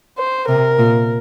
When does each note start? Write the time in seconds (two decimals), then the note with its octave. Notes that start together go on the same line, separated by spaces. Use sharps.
0.19 C5
0.48 C3 A#4
0.78 A#2